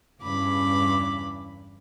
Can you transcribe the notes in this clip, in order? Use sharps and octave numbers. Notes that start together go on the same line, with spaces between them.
E2 G2 C#3 E3 B5 D6